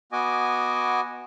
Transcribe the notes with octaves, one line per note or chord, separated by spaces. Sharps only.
B3 F#4 D#5 G#5 D6